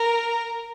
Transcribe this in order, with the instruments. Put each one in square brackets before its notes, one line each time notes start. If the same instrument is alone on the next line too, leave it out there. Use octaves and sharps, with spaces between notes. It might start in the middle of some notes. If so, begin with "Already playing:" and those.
Already playing: [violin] A#4